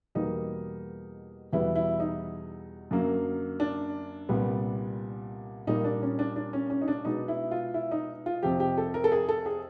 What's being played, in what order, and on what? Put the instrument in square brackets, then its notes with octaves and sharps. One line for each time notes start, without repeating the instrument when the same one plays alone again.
[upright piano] E2 B2 G3 A#3 D#4
E2 B2 G3 B3 E4
E4
D#4
F#2 D3 F#3 A#3
D4
C2 A#2 G3 B3
A#2 G3 A#3 D#4
D4
C#4
D4
D4
C#4
C#4
D#4
D4
B2 G#3 B3 D#4
E4
F4
E4
D#4
F4
F2 C3 F3 G4
G4
A4
A#4
A4
G#4
A4
G#4